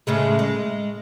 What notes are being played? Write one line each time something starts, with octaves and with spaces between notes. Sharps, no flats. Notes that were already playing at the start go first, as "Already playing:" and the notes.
A2 C#3 G#3
G#3